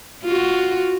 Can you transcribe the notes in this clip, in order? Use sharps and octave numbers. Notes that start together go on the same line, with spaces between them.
F4 F#4